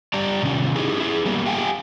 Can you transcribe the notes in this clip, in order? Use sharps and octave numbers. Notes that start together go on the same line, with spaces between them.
G3 G4 D5 A5 A#5
C3 D#3 C#4 F4
D#4 E4 G4 G#4
E4 G#4
G3 A#3 B3 C#4
G4 F5 G5 G#5